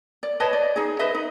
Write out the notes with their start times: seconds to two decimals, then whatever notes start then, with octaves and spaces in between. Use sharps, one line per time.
0.23 D5
0.40 B4 C#5 D#5 A5
0.53 D5
0.76 D#4 G#4
0.99 B4 C5 D#5 E5
1.15 D#4